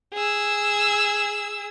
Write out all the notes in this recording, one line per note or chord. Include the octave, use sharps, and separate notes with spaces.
G#4 E6